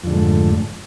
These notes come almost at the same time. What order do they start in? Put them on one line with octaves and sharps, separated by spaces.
F2 D3 G#2 A3